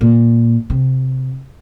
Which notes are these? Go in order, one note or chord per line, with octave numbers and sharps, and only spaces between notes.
A#2
C3